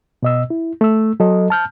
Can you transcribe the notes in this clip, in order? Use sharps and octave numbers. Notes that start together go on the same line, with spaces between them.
B2 D#5 E6
E4
A3 E6
F#3 A4 D#5
A5 F6 G6